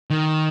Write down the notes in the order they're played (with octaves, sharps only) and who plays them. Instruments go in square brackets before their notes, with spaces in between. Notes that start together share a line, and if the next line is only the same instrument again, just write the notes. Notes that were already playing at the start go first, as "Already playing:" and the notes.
[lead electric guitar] D#3